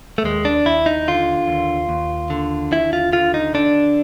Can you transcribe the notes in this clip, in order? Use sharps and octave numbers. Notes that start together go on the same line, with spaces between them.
A3
D#2 G#3
D4
D#2 E4
D#4
D3 F4
D#2
D#2
D3
D#2 E4
F4
D3 F4
D#4
D3 D4